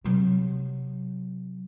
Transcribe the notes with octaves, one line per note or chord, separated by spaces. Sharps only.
C3 F#3